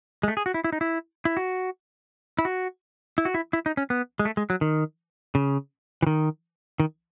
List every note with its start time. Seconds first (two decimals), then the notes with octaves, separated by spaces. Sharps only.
0.23 G#3
0.28 A3
0.37 G#4
0.46 F#4
0.54 E4
0.64 E4
0.73 D#4
0.81 E4
1.25 E4
1.37 F#4
2.39 E4
2.45 F#4
3.18 E4
3.25 F#4
3.34 E4
3.53 E4
3.66 D#4
3.77 C#4
3.90 B3
4.19 G#3
4.25 A3
4.37 G#3
4.50 F#3
4.61 D#3
5.35 C#3
6.02 E3
6.07 D#3
6.80 D#3